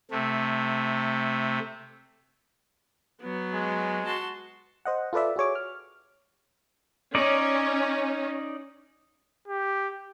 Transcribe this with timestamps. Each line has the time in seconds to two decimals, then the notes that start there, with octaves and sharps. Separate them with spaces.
0.11 C3 A3
3.21 F#3 B3
3.54 G#3
4.05 F#4 A5 C6
4.85 C5 D#5 F#5
5.13 F4 A4 B4 D5 E5
5.36 F#4 G#4 C#5 D6
5.55 F6
7.15 C#4 D#4 D5
9.48 G4